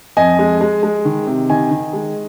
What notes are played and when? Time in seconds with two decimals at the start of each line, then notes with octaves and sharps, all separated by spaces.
0.17 F2 D#5 G#5
0.39 G#3
0.61 G#3
0.83 G#3
1.05 D#3
1.27 C3
1.50 D#3 D#5 G#5
1.71 D#3
1.93 G#3